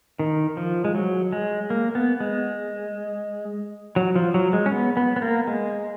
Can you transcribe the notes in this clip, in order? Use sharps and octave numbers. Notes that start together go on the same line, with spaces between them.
D#3
F3
G#3
F#3
G#3
A#3
B3
G#3
F#3
F3
F#3
G#3
C#4
B3
B3
B3
A#3
G#3